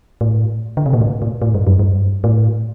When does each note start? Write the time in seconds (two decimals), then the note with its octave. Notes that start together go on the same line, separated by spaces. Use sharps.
0.21 A2
0.77 D3
0.86 C3
0.93 A#2
1.01 A2
1.22 A2
1.42 A2
1.54 G2
1.67 F#2
1.79 G2
2.24 A2